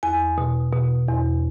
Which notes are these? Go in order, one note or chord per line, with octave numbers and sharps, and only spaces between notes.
E2 G#5
B2
B2
E2